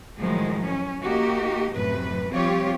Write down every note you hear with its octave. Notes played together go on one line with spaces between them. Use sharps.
A2 D#3 F3 F#3 G#3
C#4
A#3 D#4 F#4 G4
F#2 A2 C3 F#3 B4
F3 G3 C4 F4 G4 C#5